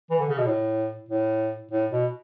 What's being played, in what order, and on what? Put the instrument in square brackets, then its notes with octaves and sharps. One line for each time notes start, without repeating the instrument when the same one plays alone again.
[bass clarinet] E3
D3
C#3
B2
A2
A2
A2
B2